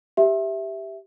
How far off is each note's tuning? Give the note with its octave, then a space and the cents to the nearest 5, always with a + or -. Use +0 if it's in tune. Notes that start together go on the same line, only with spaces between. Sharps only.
G4 +0 E5 +0